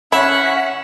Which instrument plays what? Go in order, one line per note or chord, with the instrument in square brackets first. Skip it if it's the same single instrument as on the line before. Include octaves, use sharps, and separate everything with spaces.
[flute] C#4 [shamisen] E4 [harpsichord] E5 [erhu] F#5